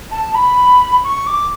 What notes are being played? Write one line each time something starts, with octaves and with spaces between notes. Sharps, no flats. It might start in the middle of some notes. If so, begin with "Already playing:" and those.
A5
B5
C#6
D6